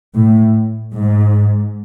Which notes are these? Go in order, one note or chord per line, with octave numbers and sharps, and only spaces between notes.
A2
G#2